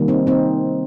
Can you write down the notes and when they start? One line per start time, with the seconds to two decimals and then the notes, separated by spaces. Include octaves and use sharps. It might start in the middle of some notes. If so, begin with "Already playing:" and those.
Already playing: C3 D#3 G3 A#3
0.08 C4 D#4
0.27 C4 D#4